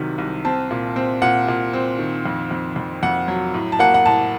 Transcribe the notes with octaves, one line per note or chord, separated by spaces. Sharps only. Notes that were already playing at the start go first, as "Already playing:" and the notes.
Already playing: C2 C3 D#3 F#3
C2
C4 A5
A#2
C4
A#2 F#5
A#2
C4
D#3
F2
F2
F2
F2 F#5
F#3
A2
A5
A#3 F#5
F#5
A2 A5